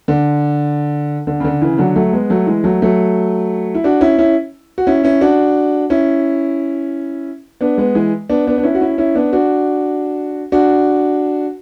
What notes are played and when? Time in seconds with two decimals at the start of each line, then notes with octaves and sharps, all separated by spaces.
0.08 D3
1.27 D3
1.40 C#3
1.44 D3
1.61 C#3 E3
1.78 D3 F#3
1.96 F#3 A3
2.13 G#3 B3
2.30 F#3 A3
2.47 E3 G#3
2.64 F#3 A3
2.82 F#3 A3
3.75 E4
3.84 D4 F#4
4.01 C#4 E4
4.18 C#4 E4
4.78 F#4
4.87 C#4 E4
5.04 C#4 E4
5.21 D4 F#4
5.90 C#4 E4
7.61 B3 D4
7.78 G#3 B3
7.95 E3 G#3
8.29 B3 D4
8.47 B3 D4
8.58 D4
8.63 C#4 E4
8.75 F#4
8.81 C#4 E4
8.98 C#4 E4
9.15 B3 D4
9.33 D4 F#4
10.52 D4 F#4